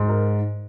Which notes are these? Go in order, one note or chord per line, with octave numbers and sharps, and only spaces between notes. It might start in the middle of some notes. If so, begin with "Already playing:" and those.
Already playing: G#2
A#4